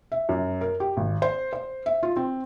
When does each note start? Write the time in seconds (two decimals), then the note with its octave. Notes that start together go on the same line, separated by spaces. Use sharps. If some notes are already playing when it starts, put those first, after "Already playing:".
0.12 E5
0.29 F#2
0.61 A#4
0.80 G4
0.97 G#1
1.22 C5
1.53 C5
1.86 E5
2.03 F4
2.17 C4